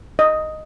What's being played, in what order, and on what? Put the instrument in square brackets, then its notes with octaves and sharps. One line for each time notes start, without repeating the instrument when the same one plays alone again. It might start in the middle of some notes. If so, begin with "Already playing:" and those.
[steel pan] D#5